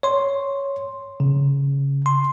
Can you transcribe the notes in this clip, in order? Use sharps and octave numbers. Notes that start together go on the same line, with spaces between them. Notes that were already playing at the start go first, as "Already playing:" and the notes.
C#5 C6
C#3
C6